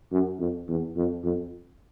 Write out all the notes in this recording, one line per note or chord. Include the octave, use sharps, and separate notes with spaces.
F#2
F2
E2
F2
F2